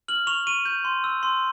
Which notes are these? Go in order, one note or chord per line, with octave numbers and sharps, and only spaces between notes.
F6 F#7
C#6 F7
C#6 D#7
G6
C6
E6
C6